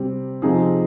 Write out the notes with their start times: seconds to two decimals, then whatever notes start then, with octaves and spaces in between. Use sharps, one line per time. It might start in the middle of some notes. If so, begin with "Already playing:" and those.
Already playing: C3 G3 C4
0.42 C3 F3 C4 D#4 G#4